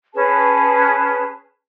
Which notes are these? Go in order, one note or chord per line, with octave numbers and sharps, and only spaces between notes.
C#4 G#4 B4 A5